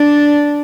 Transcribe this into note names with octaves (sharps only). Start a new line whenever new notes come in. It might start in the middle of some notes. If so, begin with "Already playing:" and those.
Already playing: D4